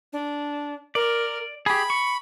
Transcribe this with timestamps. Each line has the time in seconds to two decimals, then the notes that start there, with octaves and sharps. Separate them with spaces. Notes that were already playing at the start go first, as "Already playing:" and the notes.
0.13 D4
0.95 A#4 D5
1.66 G4 G#4 B5
1.90 C#6